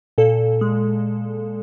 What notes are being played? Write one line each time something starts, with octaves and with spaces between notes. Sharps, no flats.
A#2 A4
G#3